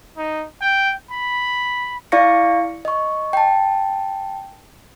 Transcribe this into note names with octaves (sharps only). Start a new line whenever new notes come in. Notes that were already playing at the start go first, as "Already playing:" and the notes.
D#4
G5
B5
E4 D5 F5 C#6 A#6 C#7
D#5 C#6
G5 A5